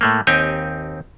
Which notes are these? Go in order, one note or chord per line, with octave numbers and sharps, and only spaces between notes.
A2 A3 A#3
D#2 C4 D#4 G4 G#5